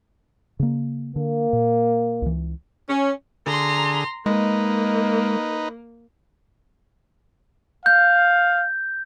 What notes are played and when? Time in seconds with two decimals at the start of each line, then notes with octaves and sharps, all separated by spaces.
0.60 C#3 A#3
1.16 D3 A#3
1.53 A#2
2.22 C#2 E3
2.88 C#4
3.47 D3 G#4 A#5 C6
4.26 G#3 A#3 D#4 B4
7.86 F5 G6